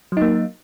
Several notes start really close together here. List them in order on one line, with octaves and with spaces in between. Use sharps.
F#3 D#4 A#3